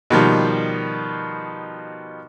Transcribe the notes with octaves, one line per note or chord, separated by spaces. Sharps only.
B2 D#3 F3 G3